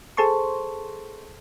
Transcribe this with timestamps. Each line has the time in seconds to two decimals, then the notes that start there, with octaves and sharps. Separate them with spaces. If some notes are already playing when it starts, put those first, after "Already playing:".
0.17 G#4 A4 C5 A5 C6 C#6